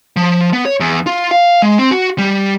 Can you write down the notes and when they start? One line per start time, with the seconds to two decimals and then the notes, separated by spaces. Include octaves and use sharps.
0.16 F3
0.53 B3
0.65 C#5
0.80 E2
1.06 F4
1.31 F5
1.62 G#3
1.79 C4
1.91 F#4
2.18 G3